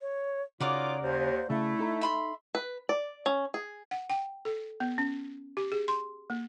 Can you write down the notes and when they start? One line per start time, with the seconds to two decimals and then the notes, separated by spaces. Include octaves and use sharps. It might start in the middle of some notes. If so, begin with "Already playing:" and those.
0.01 C#5
0.60 C#3 D#4 F4 F#4 A#4 C#5 D5 D6
1.02 D#2 C5
1.50 C#3 A3 E4
1.79 D#4 A4 A#5
2.01 E5 B5 C6
2.55 B4
2.89 D5
3.26 C#4
3.54 G#4
3.91 F#5
4.10 G5
4.45 A4
4.80 B3
4.98 C#4
5.57 G4
5.72 G#4
5.88 C6
6.30 A#3